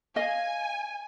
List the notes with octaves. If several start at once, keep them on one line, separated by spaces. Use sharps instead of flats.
D#5 F5 G#5